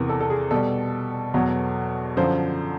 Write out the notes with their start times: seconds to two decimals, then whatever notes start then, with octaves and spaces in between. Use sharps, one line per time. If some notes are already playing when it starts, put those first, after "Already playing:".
Already playing: E2 C3 E3 A#4
0.09 A4
0.20 A4
0.30 G#4
0.51 B2 G3 A4
1.34 E2 B2 F#3
2.17 F#2 D3 F3 C5